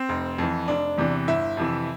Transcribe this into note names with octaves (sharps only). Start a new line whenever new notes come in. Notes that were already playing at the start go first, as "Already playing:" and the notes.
Already playing: C4
F1
F2 E3
F1 D4
E2 C3 E3
G1 E4
F2 C3 E3